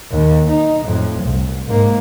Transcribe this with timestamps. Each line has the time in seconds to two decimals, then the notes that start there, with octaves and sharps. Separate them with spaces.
0.11 D#2
0.50 D#4
0.84 F2 A2
1.23 C2
1.66 G#2 A#3